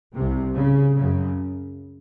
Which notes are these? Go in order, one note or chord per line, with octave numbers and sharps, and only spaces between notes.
C2 C3
C#3
F#2 C#3